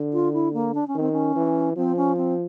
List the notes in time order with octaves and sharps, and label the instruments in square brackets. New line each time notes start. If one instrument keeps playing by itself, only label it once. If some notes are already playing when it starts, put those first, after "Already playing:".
Already playing: [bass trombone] D3
[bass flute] F4
E4
A#3
D4
C#4
[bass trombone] D#3 [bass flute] C4
[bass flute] C#4
[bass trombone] E3
[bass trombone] F3 [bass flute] C4
[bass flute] C#4
C4